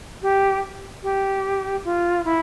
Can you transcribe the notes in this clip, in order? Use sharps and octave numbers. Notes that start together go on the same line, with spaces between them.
G4
G4
F4
E4